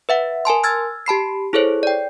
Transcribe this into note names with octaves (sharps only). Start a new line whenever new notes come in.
B4 E5 F#5
A#4 G#5 A5 C6
E6 F6 G#6 A6
G4 A5 B5 C7
E4 G#4 A4 C5 C#5
D5 G5